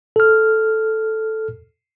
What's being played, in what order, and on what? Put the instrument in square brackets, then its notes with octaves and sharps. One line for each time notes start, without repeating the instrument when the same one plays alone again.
[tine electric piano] A4 F6